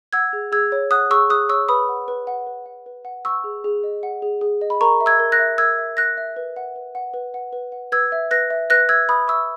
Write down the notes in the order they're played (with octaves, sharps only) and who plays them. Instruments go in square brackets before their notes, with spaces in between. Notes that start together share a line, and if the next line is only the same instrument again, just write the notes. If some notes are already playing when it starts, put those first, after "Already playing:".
[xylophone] F#5 E6 G#6
G#4
G#4 E6 G#6
C#5
F#5 D#6 F#6
G#4 C#6 E6
G#4 D#6 F#6
C#5 C#6 E6
B4 B5 D#6
F#5
B4
F#5
B4
F#5
B4
F#5
F#5 C#6 E6
G#4
G#4
D#5
F#5
G#4
G#4
D#5
B5
A#4 A#5 C#6
E5
E6 G#6
A#4
F#6 A#6
E5
A#4 E6 G#6
E5
A#4 F#6 A#6
E5
B4
F#5
B4
F#5
B4
F#5
B4
F#5
B4 E6 G#6
E5
B4 F#6 A#6
E5
B4 F#6 A#6
E5 E6 G#6
B4 B5 D#6
E5 C#6 E6